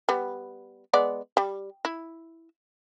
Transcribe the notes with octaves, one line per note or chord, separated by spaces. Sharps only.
G3 B3
G#3 B3 D5
G3
E4